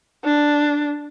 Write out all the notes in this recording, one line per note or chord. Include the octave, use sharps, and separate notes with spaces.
D4